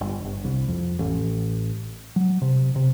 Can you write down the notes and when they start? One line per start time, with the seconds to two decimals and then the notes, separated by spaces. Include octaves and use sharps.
0.01 G1
0.24 G1
0.44 C2
0.68 F2
0.99 A1
2.16 F#3
2.42 C3
2.76 C3